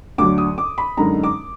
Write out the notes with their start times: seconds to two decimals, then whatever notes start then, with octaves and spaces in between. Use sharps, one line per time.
0.18 D2 D3 F#3 D6
0.38 D#6
0.58 D6
0.78 B5
0.97 F#2 D3 G#3 D#4 A#5
1.24 D6